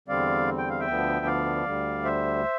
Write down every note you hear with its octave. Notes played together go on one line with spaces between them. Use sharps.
E2 D3 G3 C4 D5 F5
G5
F5
E5 G5
D2 D3 F3 B3
D5 F5
D2 D3 G3
C5 E5